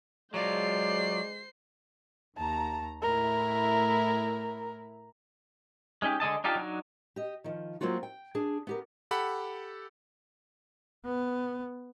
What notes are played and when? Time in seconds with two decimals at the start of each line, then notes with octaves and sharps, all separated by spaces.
0.34 F#3 G#3 F4 C5 D5 C7
2.37 D#2 A5 A#5
3.02 A2 E4 A#4
6.02 G#3 C#4 D#4 G4
6.20 D3 G#3 D#5 A5
6.44 D4 D#4 F4 G4 A5
6.55 F#3 D4 D#4
7.16 G4 D#5
7.44 D#3 F3
7.81 F#3 A#3 C4 F4 F#4
8.03 G5
8.35 D4 G#4
8.67 B3 G4 A#4
9.11 G4 A4 F#5 B5
11.05 B3